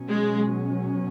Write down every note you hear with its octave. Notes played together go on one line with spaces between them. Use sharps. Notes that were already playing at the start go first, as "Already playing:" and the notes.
Already playing: B2 F#3 C#4
G#3